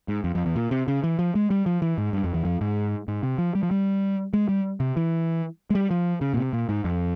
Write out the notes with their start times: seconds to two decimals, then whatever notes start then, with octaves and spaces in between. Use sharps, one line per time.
0.08 G#2
0.24 F2
0.35 F2
0.46 E2
0.56 A#2
0.71 C3
0.88 C#3
1.04 E3
1.19 F3
1.35 G#3
1.50 G3
1.66 F3
1.82 E3
1.98 G#2
2.13 G2
2.24 F2
2.34 E2
2.45 F2
2.61 G#2
3.08 G#2
3.23 C3
3.38 F3
3.55 G3
3.63 F3
3.71 G3
4.33 G#3
4.49 G3
4.80 C3
4.97 E3
5.70 G#3
5.75 G3
5.91 F3
6.21 C#3
6.34 A#2
6.37 C3
6.53 A#2
6.69 G#2
6.84 F2